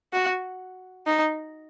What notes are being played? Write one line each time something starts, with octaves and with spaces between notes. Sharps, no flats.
F#4
D#4